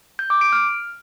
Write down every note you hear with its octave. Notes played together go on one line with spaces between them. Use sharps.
G6
D6
D7
F6